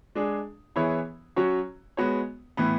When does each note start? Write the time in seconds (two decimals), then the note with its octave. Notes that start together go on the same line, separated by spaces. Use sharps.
0.15 G#3 D4 G#4
0.76 E3 B3 E4 G#4 C#5
1.36 F#3 C#4 F#4 C#5
1.97 G#3 B3 F#4 C#5
2.57 A2 E3 B3